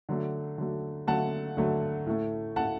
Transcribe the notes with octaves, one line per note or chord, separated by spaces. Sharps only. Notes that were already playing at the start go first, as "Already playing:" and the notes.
D3 F#3 A3
D3 F#3 A3
D3 F#3 A3 F#5 A5
D3 F#3 A3
A2 A3
A2 A3 F#5 A5